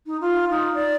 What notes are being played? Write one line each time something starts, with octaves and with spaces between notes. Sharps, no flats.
D#4
F4
D#4
D5